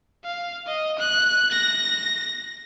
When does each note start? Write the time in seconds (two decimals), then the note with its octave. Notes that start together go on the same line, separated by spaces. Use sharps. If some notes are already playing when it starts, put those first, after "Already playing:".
0.25 F5
0.67 D#5
0.99 F#6
1.51 A#6